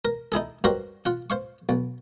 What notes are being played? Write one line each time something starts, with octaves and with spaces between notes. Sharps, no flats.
A#4
D#4 E4 G#4 A4
G2 F#4 G4 A#4 C5
F4 F#5
C5 F5 C#6
B1